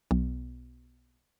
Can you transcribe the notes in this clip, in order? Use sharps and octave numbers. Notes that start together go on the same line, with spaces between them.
B1